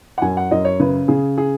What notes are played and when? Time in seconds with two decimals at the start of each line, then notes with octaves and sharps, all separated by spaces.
0.18 F#5
0.22 F#2 G#5
0.37 F#5
0.51 F#2 D#5
0.65 C#5
0.80 C#3 B4
1.08 C#3 G#4
1.38 G#4